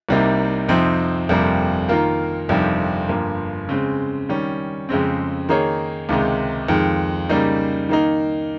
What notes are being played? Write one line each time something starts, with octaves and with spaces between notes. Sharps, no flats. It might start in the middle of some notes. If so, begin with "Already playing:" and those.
C2 C3 G3 A#3 D#4
F2 C3 F3 C4 D#4
G1 F2 C3 G3 A#3
D#3 A#3 F4 A#4
G1 F2 C3 D#3 G3
G1 G2 F3 A#3
C#3 G#3 C4
D#3 G3 C#4
F2 C#3 G#3 C4
D#3 A#3 D#4 G#4 C#5
C#2 C3 D#3 G#3 D#4
F2 D#3 G#3
C#3 G3 A#3 D#4
D#3 A#3 D#4